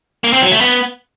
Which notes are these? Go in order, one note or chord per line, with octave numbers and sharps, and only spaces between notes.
A#3
C4
F#3
A3
B3